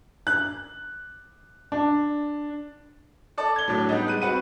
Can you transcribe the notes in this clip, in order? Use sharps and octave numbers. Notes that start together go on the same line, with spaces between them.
F#6
D4
A4 D5 A5
G#6 G7
A2 F#3 D4
G3 B3 D#4
G#3 F#6 D#7
C4 F#4 B4 F#5 D#7